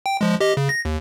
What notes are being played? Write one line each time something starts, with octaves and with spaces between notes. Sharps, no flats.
G5
F3 G#3
G4 D#5
C#3
A#6
D#2